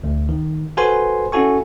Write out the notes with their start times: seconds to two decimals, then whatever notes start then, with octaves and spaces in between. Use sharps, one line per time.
0.03 D2
0.29 D#3
0.77 F#4 A4 B4 C5 G#5 C6
1.32 C#4 E4 F#4 A4 G#5 C#6